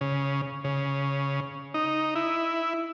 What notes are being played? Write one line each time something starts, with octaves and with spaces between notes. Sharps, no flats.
C#3
C#3
D#4
E4